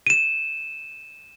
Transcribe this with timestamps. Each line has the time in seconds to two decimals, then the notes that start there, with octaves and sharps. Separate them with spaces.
0.07 D#7 E7